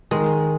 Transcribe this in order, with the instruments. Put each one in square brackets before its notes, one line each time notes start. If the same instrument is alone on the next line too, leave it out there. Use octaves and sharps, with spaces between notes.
[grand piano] D#3 [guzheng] G#3